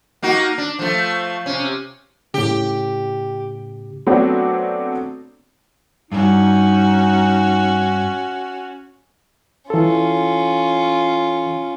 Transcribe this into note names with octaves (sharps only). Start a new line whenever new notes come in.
A#3 D#4 F#4
D4
F3 A3
C3 C#4
A2 C#3 G4
F#3 A3 B3 C4 D4 F#4
G2 C#4 D#4 F#4
E3 C#4 F4 A4